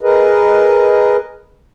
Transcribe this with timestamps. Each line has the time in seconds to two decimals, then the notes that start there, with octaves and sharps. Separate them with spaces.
0.01 G#4 A#4 B4 D#5